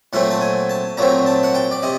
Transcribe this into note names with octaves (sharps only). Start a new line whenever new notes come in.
A#2 F#3 A3 C4 F#5
A5
G#5
A5
A#2 F#3 A3 C4 A#5
A5
F#5
G5
D5
C3 D#5